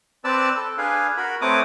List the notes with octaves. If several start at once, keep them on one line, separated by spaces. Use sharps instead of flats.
C4 B4 D5 A5 E6
A4
D4 G#4 B4 F5
F#4 A#4 B5
A3 C4 B4 C#5 D6 D#6